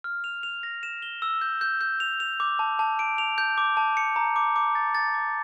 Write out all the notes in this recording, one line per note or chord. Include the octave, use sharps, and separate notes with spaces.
F6
F7
F7
A#6
E7
G7
E6
G6
G6
G6
F7
F7
D6
A5
A5
D7
F7
G6
D6
A5
C#7
A#5
D6
D6
A6
A6
D6